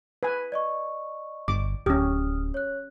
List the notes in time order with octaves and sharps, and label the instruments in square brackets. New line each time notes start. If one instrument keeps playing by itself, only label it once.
[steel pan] B4 G#5
[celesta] D5 D#5 C#6
[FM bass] G1 [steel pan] D6
[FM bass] D1 [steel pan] C#4 G4 [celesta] D#6 F6
[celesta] C#5 F#6